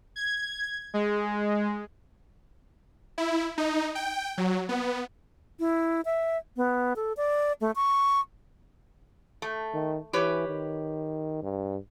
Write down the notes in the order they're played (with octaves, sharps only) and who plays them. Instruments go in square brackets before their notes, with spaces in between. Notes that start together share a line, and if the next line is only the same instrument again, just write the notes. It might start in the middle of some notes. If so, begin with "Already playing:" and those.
[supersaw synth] G#6
G#3
E4
D#4
G5
F#3
B3
[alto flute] E4
E5
B3
A4
D5
A3
C#6
[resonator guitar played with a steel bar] A3
[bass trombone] D#3
[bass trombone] E3 [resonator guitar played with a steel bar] G4 B4 C#5
[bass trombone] D#3
G2